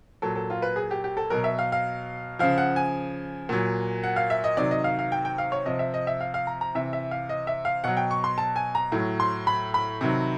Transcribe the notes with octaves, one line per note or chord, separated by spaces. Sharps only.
A#2 F#3 A4
A4
F4
B4
G#4
G4
G4
A4
B2 F#3 A#4
E5
F5
F5
C#3 F3 F5
F#5
G#5
A#2 F#3
F#5
F5
E5
D#5
C3 D#3 F#3 D5
D#5
F5
F5
G5
G5
F5
C#5
C3 F3 D#5
E5
D#5
E5
F5
F5
A#5
A#5
C3 E3 E5
E5
F5
D#5
E5
F5
B2 F#3 F#5
G5
C#6
C6
A5
G#5
A#5
A2 F#3
C6
B5
B5
C3 D#3 F#3